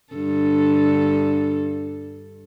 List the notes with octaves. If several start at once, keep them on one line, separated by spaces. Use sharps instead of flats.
G2 D3 A4